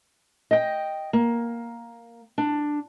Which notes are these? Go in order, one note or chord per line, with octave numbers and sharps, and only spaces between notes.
D#5 G5
A#3
D4